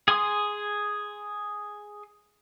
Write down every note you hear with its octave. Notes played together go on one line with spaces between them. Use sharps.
G#4 G#5 C6 D#6